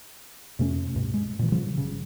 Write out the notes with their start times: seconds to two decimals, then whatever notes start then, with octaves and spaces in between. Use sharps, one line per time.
0.59 F2 C3 A3 C#4
0.94 C#2 G2 B2
1.14 G#3
1.39 A#2 E3
1.52 C#3 F3 G3
1.77 G1 C#3